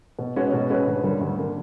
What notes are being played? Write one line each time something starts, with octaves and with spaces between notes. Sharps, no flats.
B2
G#3 C#4 F#4 B4
B2
G#3 C#4 F#4 B4
D2
D3 G3 A#3
D2
D3 G3 A#3